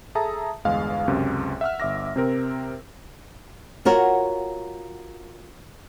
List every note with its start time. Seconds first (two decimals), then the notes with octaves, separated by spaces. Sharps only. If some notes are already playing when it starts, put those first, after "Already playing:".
0.15 G#4 A4 E5 A5 A#5 D#6
0.65 G1 E2 G#3 F5
1.08 C#2 F#2 C3
1.61 E5 F#5 E6 F6
1.80 G1 E5 D6 A#6
2.16 C3 C4 A#4
3.85 F4 F#4 A#4 C#5